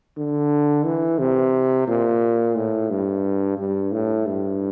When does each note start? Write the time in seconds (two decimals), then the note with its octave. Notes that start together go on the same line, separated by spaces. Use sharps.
0.17 D3
0.85 E3
1.19 C3
1.88 A#2
2.56 A2
2.90 G2
3.58 G2
3.92 A2
4.26 G2